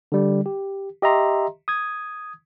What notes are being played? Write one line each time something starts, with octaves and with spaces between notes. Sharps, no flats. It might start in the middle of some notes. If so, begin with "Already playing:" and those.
D3 G3
G4
G4 D#5 E5 A#5 C6
D#6 G#6